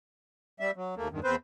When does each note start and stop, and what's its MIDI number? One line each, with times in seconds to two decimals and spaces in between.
0.60 0.71 55
0.60 0.71 76
0.76 0.95 54
0.97 1.08 39
0.97 1.08 57
0.97 1.08 58
1.11 1.20 40
1.11 1.20 43
1.11 1.20 51
1.24 1.36 40
1.24 1.36 60
1.24 1.36 71
1.24 1.36 72